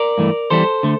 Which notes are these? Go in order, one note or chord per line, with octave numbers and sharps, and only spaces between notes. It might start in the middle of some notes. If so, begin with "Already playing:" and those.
Already playing: A#4 D5
G2 E3 A3
E2 E3 G3 A4 C5
D3 A3